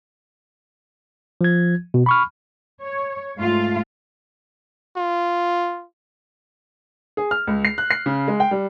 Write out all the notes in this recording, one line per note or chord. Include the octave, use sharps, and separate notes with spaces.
F3 G#6
B2
B5 C#6 F6
C#5
G#2 A3 F4 F5
F4
G#4
F6
C#2
C7
F#6
C7
C#3
G#3
G5
G3